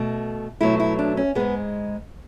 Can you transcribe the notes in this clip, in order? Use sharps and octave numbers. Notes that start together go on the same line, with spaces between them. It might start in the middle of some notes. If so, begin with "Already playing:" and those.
Already playing: B2 A3
B2 F#3 A3 E4
E4
D4
C#4
G#2 G#3 B3